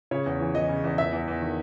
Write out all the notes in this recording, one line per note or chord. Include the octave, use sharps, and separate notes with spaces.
C#3 C#5
E2
E3
E3 D#5
C#3
E2
E2 E5
E2
E2
D#3